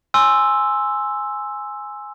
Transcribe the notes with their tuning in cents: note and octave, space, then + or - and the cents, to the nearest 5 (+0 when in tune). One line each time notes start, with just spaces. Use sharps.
G#5 +0 C6 +5 E6 +0